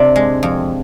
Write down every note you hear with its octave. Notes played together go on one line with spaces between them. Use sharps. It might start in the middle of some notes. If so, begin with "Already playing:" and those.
Already playing: C3 D4
G#3
F2